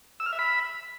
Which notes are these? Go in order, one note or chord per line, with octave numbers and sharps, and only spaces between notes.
E6
F6
E5
B5